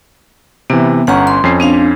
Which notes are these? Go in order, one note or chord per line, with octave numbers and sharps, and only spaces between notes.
C3 E3 B3
G1 C#4 F#5 A#5 C#6
C6
F2 C#4 C7
C4 D4 F5